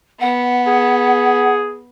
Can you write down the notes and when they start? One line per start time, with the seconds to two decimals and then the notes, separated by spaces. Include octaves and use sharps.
0.20 B3 F#5
0.67 G#4